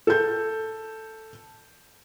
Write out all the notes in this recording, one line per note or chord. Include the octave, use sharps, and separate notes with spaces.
A4 G6